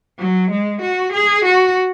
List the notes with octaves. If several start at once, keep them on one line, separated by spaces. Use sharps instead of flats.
F#3
G#3
F#4
G#4
F#4